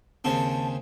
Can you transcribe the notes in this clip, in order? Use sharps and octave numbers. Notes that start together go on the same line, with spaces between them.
D#2 C#3 C4 A5